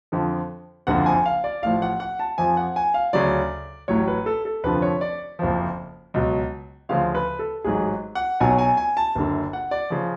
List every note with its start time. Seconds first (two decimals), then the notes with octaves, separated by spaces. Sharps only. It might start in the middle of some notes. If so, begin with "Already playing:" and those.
0.12 F2 D3 F3
0.87 F#1 F2 D3 F3 F#5
1.06 G#5
1.26 F5
1.44 D5
1.62 A1 A2 F3 F5
1.82 F#5
2.00 F#5
2.19 A5
2.38 F2 F3 G#5
2.57 F#5
2.76 G#5
2.94 F5
3.13 D2 C#3 F#3 D5
3.88 A1 A2 F#3 C#5
4.08 B4
4.26 A4
4.45 A4
4.63 F1 F2 D3 F3 B4
4.82 C#5
5.01 D5
5.39 F#1 F2 F3
6.14 C#2 B2 F#3
6.89 D2 C#3 F3 F5
7.15 B4
7.39 A4
7.64 A1 G#2 F#3 G#4
8.15 F#5
8.40 B1 B2 F#3 G#5
8.58 G#5
8.77 G#5
8.97 A5
9.15 F#1 F#2 D3
9.53 F#5
9.71 D5
9.90 C#3 F3